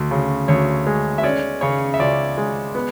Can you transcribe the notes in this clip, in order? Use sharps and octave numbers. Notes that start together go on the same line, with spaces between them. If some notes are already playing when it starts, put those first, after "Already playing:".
Already playing: D2
C#3
D2 C#5
G#3
E5
C#4 D5
C#3 C#5
E5
C#2 D5
G#3
B3